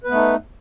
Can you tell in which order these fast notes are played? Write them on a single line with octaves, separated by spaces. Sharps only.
B4 B3 A3 D#4